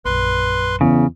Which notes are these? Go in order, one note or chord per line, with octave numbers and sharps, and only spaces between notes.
A#1 F#2 B4 C6
E2 C#3